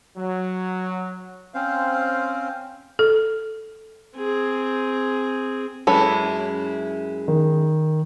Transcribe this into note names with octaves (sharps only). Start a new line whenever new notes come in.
F#3
C4 C#4 C5 F5
A4
C4 G#4
F#2 G#3 E4 A4 B4 C#5
D#3